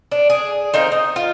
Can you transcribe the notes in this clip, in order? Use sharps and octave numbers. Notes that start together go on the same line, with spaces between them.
D4
G#4
C4 D#4 A#4 F5
D#4
F4